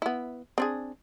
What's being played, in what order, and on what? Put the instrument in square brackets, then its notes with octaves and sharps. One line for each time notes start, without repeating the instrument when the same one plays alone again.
[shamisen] B3 E4
C4 D4 G#4